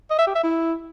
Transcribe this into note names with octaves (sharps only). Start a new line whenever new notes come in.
D#5
E5
G4
E5
E4